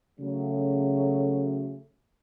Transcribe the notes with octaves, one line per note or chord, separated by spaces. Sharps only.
C#3 F#3 A3